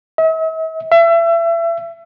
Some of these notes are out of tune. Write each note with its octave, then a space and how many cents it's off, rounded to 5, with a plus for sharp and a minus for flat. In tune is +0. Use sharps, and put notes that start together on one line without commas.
E5 -45
E5 +30